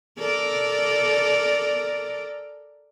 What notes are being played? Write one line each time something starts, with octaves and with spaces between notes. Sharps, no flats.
A4 A#4 D5